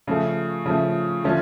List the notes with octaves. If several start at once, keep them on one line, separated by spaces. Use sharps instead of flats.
C#3 F3 A3
C#3 F3 A3
D3 F3 A3 C#4 F4